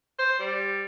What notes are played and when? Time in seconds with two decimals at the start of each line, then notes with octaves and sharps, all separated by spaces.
0.19 C5
0.40 G3